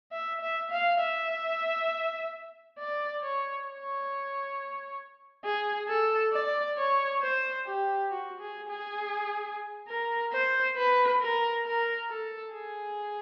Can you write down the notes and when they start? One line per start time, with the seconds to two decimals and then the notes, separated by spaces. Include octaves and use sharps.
0.12 E5
0.41 E5
0.71 F5
1.01 E5
2.79 D5
3.23 C#5
3.67 C#5
5.45 G#4
5.88 A4
6.33 D5
6.77 C#5
7.21 C5
7.66 G4
8.10 F#4
8.40 G#4
8.69 G#4
9.88 A#4
10.32 C5
10.77 B4
11.21 A#4
11.65 A#4
12.10 A4
12.54 G#4